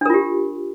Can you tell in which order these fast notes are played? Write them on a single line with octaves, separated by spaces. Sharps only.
D4 A#4 F4 G4